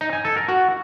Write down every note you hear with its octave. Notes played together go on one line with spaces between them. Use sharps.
D#4
G#5
A4
A#4
F#4